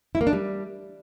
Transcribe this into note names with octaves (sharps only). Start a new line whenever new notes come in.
E4
A#3
D4
G3